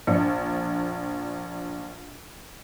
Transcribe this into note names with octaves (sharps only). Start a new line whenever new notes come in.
A#1 D4 C#7